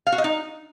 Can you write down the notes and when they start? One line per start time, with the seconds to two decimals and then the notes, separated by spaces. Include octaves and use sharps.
0.07 F5
0.12 F#4
0.18 D#5
0.24 D#4